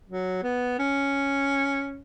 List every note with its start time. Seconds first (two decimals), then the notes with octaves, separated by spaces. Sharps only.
0.09 F#3
0.43 B3
0.79 C#4